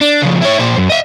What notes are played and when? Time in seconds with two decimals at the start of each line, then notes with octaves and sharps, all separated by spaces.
0.01 D4
0.23 F2 C#3
0.42 E4 C#5
0.60 A#2 C5
0.78 F#2
0.89 D#5 E5